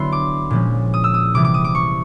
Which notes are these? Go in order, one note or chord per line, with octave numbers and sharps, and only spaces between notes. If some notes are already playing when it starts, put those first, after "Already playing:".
Already playing: D3 F#3 B3 E4 C6
D6
A#2 F3 G#3 C#4
D#6
E6
D#6
C3 E3 G3 D6
D6
D#6
D6
C#6